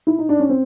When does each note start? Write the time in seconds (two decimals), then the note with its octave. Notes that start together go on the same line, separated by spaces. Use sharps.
0.07 E4
0.19 D#4
0.29 D4
0.40 C#4
0.49 C4